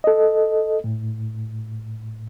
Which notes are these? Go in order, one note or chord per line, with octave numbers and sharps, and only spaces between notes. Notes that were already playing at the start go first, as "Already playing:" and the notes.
A4 D#5
A2